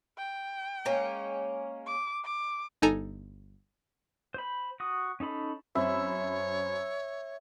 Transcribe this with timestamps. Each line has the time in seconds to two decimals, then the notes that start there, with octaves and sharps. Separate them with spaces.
0.18 G5
0.85 G#3 A#3 C#4
1.87 D6
2.25 D6
2.82 G1 D#4 A4 G#5 A#5
4.34 C5 B5
4.80 F#4 D#6
5.20 C#4 D#4 A4 B5
5.75 F#2 C4 C#5 E5 B5